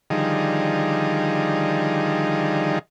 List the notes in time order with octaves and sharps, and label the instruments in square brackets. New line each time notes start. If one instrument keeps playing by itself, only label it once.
[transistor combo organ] D3 D#3 F3 G3 D#4 G#4